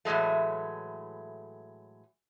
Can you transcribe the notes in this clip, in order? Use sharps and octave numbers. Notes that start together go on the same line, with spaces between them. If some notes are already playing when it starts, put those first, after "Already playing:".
A2 E3 F#3 G#3 A3